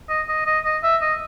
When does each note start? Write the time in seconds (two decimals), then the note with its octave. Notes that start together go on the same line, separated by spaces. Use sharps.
0.09 D#5
0.29 D#5
0.46 D#5
0.65 D#5
0.83 E5
1.02 D#5